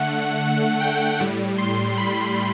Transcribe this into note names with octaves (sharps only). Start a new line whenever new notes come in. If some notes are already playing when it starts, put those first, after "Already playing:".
Already playing: D3 A3 F#5
G5
A2 G3
C6
B5